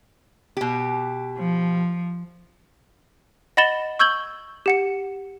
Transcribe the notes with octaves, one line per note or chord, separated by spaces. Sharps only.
B2 G4
F3
D#5 F#5 B5 A6 E7 G7
C#6 E6 G6 G#6 F#7 G7
G4 F#5 C#7